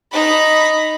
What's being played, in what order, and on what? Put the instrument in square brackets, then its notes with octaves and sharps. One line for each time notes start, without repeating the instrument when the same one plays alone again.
[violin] D#4 B5